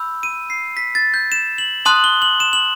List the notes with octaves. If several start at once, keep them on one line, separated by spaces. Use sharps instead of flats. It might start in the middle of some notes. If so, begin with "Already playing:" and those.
Already playing: B5 E6 G6
D#7
C7
B6
A6
G6
E7
F#7
A5 C6 D#6 F#6 F#7
G7
F#7
E7
F#7